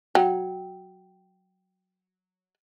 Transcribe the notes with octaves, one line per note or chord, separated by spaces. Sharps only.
F#3 G5